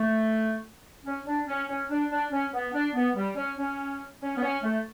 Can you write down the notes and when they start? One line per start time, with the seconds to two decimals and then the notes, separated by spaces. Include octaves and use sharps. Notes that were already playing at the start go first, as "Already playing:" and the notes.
Already playing: A3
1.05 C#4
1.26 D4
1.47 C#4
1.68 C#4
1.89 D4
2.10 D4
2.31 C#4
2.53 B3
2.73 D4
2.94 B3
3.15 G3
3.36 C#4
3.58 C#4
4.21 C#4
4.36 B3
4.42 C#4
4.63 A3